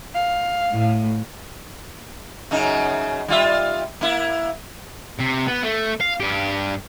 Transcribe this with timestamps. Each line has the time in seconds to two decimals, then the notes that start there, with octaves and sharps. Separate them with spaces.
0.14 F5
0.73 A2
2.51 F#2 C#3 D#4
3.28 G3 F4 E5
4.01 A#3 E4
5.19 C3
5.47 B3
5.63 A3
6.01 F5
6.20 G2 G4